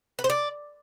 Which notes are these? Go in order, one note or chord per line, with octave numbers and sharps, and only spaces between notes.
B4
C5
D5